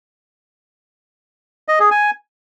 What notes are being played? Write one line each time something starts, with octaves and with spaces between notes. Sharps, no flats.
D#5
G#4
G#5